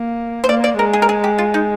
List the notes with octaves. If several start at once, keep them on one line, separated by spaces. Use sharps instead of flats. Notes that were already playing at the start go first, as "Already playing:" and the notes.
Already playing: A#3
C5
A#3 D5
D5
G#3 A#4
G#4
A#4
G#4
G4
F4
D#4